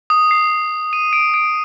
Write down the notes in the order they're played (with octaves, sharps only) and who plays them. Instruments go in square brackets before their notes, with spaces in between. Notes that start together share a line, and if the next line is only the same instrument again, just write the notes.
[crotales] D#6
C7
D#7
D7
D7